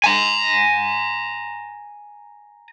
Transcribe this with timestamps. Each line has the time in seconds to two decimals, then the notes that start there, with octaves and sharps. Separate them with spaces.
0.04 G#5 A#5